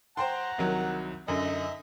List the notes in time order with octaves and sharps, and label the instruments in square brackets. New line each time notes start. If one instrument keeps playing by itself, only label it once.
[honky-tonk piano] C5 G5 C6 [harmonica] F#5 A#5
[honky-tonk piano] C2 D#3 F#3
[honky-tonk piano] F#2 D3 [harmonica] D#4 D#5 E5